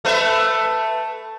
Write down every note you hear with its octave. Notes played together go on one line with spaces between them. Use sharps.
A3 B4 E5